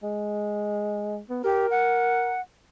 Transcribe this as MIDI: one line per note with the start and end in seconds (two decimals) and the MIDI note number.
0.03 1.20 56
1.30 1.40 59
1.44 1.66 67
1.44 2.36 70
1.71 2.41 78